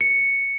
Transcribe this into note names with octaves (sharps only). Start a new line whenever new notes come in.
C#7